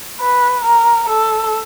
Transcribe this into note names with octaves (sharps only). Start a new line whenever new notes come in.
B4
A#4
A4